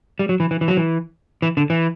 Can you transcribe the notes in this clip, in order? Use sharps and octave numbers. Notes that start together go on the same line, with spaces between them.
G3
F#3
E3
E3
E3
F#3
E3
E3
D3
E3